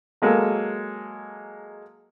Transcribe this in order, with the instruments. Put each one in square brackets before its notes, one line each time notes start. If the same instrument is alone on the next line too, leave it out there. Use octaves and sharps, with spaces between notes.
[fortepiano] F#3 G#3 A#3 A4